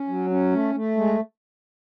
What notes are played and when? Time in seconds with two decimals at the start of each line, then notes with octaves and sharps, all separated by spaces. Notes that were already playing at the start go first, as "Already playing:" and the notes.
Already playing: C#4
0.08 F#3
0.30 C#4
0.53 A3
0.75 A3
0.97 G#3